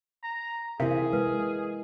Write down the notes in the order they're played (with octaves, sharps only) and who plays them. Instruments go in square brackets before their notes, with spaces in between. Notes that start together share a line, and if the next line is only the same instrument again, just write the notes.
[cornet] A#5
[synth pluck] C3 [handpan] E4 A#4 [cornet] G#4 [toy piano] F5
[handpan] G#3 [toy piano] B4